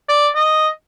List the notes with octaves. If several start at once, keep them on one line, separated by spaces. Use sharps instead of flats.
D5
D#5